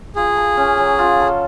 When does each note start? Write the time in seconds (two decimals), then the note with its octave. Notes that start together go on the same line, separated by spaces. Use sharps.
0.16 F4 G#4
0.37 A4
0.57 C#4
0.78 F#3
0.99 F4
1.20 A4